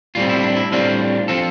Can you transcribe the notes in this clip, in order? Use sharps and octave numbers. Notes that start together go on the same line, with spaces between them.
A2 G3 C4 F4
E4
D4
E4
A2 G3 C4 D4 F4
F3 C4 F4 A4